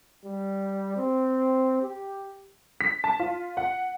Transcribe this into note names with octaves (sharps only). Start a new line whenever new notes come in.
G3
C4
G4
B6
A5
F4
F#5